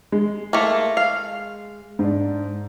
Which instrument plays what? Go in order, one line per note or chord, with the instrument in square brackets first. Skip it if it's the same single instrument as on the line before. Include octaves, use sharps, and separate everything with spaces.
[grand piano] G#3
[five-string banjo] A3 A#3
F5
[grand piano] G#2 D4